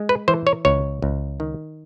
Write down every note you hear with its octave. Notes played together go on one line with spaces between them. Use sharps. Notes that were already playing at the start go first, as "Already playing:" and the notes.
Already playing: G#3
B4
E3 C5
C#5
C#2 C#5
C#2
D#3